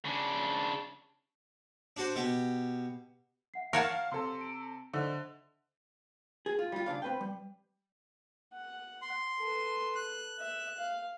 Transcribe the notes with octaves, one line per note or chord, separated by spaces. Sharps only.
C#3 D4
D4 F#4 C5
B2 G4
E5 F#5 C7
A#4 C#5 F5 F#5 A5 F#6
C3 A4 C6
D7
D3 C5 D#5 E5
G#4
F4
G3 F4
C#3 D4 D5 F5
C4 B4 G5
G3
F#5
C6
A4 B4
F#6
E5
F5